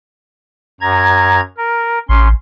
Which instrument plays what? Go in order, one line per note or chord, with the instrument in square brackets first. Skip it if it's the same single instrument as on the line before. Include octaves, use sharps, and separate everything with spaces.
[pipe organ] F#2 A#5 G#6
A#4
[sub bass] A1 [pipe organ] C#4 C6